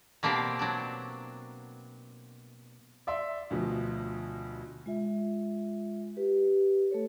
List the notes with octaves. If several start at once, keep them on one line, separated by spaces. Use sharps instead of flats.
B2 A#3 C4 D4 G4
F#3 D4
D5 E5 C6
D2 B2 F3
G#3 F4 E5
G4 B4
A3 A4 C#5